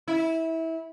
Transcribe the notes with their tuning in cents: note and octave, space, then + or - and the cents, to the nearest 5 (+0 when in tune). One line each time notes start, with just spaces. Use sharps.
E4 -20